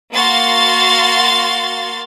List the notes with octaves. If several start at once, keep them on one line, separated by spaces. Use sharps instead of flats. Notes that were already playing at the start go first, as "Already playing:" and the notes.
A#3 F#4 F5 C6 A6